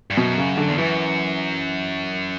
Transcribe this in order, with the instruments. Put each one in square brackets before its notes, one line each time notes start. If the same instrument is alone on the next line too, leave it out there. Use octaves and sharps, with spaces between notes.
[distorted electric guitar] G2
[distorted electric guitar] F#2 [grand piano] B2
[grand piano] C#3
D3
[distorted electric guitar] E2
[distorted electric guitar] F#2 [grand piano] E3